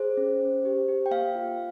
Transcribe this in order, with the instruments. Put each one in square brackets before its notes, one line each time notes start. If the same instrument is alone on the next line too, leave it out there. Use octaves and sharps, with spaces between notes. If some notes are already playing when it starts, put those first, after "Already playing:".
Already playing: [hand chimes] G#4 C5
C#4
C#4
G4
G4
G5
A#3 F5
F4